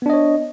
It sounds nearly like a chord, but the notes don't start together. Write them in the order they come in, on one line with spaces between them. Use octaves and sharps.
B3 D4 D#5 C#5